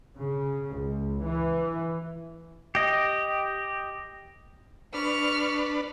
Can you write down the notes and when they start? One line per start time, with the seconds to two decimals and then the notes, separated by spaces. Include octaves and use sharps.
0.18 C#3
0.75 C#2
1.26 E3
2.75 G4 D#5
4.94 D4 B4 C#6 F6